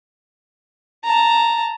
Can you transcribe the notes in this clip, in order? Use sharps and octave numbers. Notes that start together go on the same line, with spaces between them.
A5 A#5